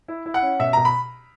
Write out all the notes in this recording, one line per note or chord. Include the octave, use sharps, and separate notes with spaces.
E4
E4
F#5
C#4
B2 E5
B2 A#5
B5